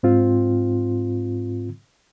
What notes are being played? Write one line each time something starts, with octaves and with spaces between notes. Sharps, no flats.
G#2 C4 F4